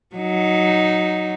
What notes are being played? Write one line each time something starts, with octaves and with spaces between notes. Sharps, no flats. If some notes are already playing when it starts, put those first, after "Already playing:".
F#3 D#4